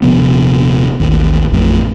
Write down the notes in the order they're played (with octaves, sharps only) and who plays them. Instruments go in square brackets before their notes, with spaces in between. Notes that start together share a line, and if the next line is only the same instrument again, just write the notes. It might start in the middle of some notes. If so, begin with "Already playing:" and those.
[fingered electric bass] D#1 C3 F3 B3
A1 D#2
A1 F2 A2